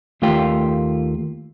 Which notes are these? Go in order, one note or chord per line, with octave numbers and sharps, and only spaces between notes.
D#2 A3 A#3 F4 G4 G5